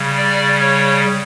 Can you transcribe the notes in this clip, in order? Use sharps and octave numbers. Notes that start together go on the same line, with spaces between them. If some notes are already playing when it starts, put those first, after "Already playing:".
Already playing: C#3 G3
D5
C#5